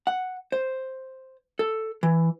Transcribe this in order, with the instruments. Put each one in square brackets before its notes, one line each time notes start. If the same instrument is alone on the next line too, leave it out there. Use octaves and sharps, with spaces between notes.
[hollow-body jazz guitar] F#5
C5
A4
E3